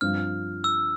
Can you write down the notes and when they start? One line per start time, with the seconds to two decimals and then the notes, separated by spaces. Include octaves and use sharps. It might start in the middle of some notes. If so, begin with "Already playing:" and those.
0.01 G2 F3 C4 F4 F6
0.64 E6